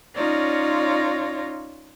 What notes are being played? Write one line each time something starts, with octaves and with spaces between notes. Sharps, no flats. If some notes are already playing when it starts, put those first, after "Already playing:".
C#4 D#4 F4 C#5 D5 A#6